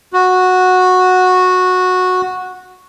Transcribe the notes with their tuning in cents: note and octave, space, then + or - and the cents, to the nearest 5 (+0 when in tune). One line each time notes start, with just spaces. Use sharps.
F#4 -10